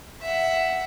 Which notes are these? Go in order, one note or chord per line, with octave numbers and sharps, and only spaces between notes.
E5 F#5